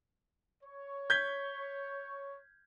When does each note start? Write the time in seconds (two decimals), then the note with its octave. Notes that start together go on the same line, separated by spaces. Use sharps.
0.64 C#5
1.10 G6 G#6 B6